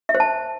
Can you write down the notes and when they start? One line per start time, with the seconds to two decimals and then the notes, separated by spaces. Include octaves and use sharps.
0.09 E5
0.15 C5
0.20 A5